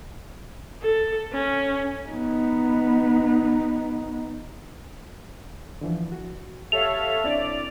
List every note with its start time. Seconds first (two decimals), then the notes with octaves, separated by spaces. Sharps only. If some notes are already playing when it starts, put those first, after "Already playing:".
0.82 A4
1.33 C#4
2.09 B3 D#4
5.81 D3 E3 F3
6.12 F#4
6.72 G4 A4 C#5 E5 F5 F7
7.24 C4 D4 E4 D5